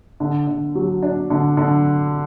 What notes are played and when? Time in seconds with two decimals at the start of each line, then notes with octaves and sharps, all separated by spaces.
0.20 D3
0.47 D3
0.75 F#3
1.02 D4
1.30 D3
1.57 D3